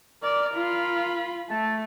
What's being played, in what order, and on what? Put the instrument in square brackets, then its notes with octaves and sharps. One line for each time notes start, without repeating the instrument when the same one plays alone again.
[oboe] A#4 [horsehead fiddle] D5
[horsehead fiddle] F4 B5
[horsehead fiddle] A3 [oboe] A5